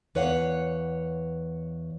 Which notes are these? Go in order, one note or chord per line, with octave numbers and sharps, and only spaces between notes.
E2 B4 C#5 F5 F#5